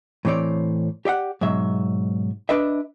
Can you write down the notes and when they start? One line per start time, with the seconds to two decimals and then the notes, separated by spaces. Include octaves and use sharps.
0.25 A2 E3 C4 C#5 D5
1.05 G4 D5 E5 F#5
1.41 G#2 B2 F#3 E5
2.49 D4 B4 D#5 E5